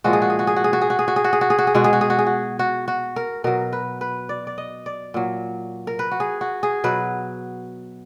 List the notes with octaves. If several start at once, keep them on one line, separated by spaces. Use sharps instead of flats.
A#2 F3 G#3 F#4
G#4
F#4
G#4
F#4
G#4
F#4
G#4
F#4
G#4
F#4
G#4
F#4
G#4
F#4
G#4
F#4
G#4
F#4
G#4
B2 G#3 F#4
G#4
F#4
G#4
F#4
G#4
F#4
F#4
F#4
A#4
B2 F#3 A#4
B4
B4
D5
D5
D#5
D5
A#2 F#3
A#4
B4
F#4
G#4
F#4
G#4
B2 F#3 B4